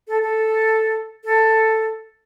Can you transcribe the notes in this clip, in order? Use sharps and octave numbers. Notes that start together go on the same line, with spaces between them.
A4
A4
A4